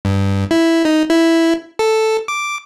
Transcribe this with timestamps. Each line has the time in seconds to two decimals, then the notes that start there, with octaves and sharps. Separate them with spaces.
0.05 G2
0.51 E4
0.85 D#4
1.10 E4
1.79 A4
2.28 D6